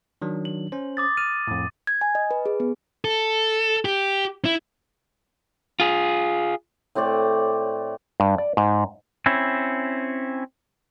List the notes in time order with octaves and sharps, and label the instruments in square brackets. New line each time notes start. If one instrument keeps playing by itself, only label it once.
[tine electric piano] D#3 F#3 D4
[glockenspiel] F#7
[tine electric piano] C#4 C5
[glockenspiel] D6 D#6 A6
[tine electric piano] F6 [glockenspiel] D#7
[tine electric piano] F2 A2
[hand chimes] G#6
G#5
D#5
B4
G#4
B3
[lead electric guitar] A4
G4
E4
F4 G#4
[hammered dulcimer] A2 C4 C#5 D5
[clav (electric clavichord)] G2
D5
G#2
[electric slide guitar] C4 C#4 E4